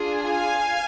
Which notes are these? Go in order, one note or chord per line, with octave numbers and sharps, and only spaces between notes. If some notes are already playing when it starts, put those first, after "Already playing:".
Already playing: D4 F4 G#4
F5 G#5